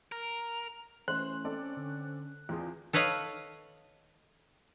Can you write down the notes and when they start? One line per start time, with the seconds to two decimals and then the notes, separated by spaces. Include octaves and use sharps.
0.12 A#4
1.08 E3 A3 C#4 C5 F#6
1.44 C4 A4 D5
1.77 D3
2.49 E2 C4 F4 G#4
2.93 A4 B4 C#5 D#5 F5